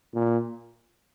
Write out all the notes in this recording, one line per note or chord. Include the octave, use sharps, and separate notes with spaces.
A#2